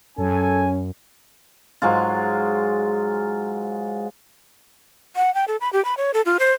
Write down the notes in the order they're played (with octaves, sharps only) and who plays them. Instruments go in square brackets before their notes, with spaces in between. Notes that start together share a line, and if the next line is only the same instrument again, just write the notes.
[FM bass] F#2 [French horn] C#4 [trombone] A4 [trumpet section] G#5
[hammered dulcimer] G#2 F#3 G#3 F4
[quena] F#5
G5
A4
B5
G4
B5
C#5
A4
F4
C5